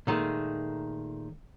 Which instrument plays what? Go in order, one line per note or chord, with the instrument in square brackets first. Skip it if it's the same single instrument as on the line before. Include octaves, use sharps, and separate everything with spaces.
[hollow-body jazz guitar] A#2 D#3 G#3 A3